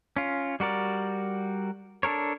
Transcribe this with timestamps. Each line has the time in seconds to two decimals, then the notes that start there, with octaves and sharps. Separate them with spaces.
0.16 C#4 F4
0.60 G3 F#4 A#4 D5
2.03 D4 A4 A#4 C#5